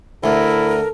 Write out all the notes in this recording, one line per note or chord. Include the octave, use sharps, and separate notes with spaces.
D2 E4 A4 A#4